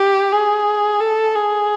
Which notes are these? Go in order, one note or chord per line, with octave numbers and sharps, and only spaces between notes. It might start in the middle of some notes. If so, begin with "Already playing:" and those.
Already playing: G4
G#4
A4
G#4